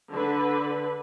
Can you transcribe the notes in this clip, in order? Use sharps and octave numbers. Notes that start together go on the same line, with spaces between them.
D3 B4